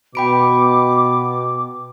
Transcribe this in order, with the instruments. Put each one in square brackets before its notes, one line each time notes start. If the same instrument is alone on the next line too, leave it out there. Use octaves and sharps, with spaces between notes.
[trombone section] B2 [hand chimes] G5 B5 D7 [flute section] D6